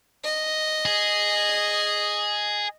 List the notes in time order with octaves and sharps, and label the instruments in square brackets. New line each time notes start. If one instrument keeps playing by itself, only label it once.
[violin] D#5
[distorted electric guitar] G#4